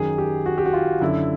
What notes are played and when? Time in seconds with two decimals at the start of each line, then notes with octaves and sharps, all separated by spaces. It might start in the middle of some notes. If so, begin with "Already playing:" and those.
Already playing: F#2 D#3 G#4
0.18 G4
0.46 F#4
0.58 G4
0.65 F#4
0.73 F4
1.01 F#2 D3 E4